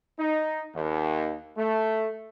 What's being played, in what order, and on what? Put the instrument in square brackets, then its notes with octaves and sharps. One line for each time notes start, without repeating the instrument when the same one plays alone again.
[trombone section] D#4
D#2
A3